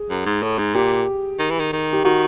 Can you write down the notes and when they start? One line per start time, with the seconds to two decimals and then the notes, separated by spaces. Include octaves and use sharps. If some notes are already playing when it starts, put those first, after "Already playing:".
Already playing: G#4
0.10 F#2
0.26 G#2
0.42 A2
0.58 G#2
0.75 A#2 G4
1.39 D#3
1.50 E3
1.60 D#3
1.73 D#3
1.93 G4
2.04 D#3 F#4